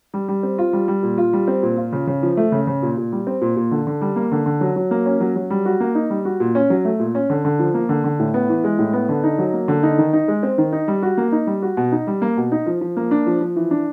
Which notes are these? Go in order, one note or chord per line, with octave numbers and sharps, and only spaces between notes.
G3
G3
C4
F4
G3
G3
A#2
F4
G3
C4
A#2
F4
C#3
C#3
F3
A3
C#3
C#3
A#2
A#2
G3
C4
A#2
A#2
D3
D3
G3
A#3
D3
D3
F#3
F#3
A#3
C#4
F#3
F#3
G3
F#4
A#3
D#4
G3
F#4
A#2
C#4
F#3
A3
A#2
C#4
D3
D3
F3
A#3
D3
D3
A2
B3
E3
G#3
A2
B3
D3
D#4
F#3
A#3
D3
D#4
D#3
D#4
G#3
C4
D#3
D#4
G3
F#4
A#3
D#4
G3
F#4
B2
D#4
G3
A#3
B2
D#4
F3
F3
A#3
D4
F3
F3
E3
D4